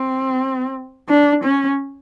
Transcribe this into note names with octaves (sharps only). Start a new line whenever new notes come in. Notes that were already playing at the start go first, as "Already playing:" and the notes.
Already playing: C4
D4
C#4